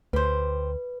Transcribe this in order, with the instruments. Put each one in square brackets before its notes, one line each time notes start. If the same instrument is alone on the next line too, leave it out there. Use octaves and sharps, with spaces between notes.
[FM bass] D2 [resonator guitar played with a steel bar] G4 C5 [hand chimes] B4